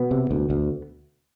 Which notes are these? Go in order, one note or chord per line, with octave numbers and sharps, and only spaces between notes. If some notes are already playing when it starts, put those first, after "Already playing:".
Already playing: B2 B3
C3
D2
D2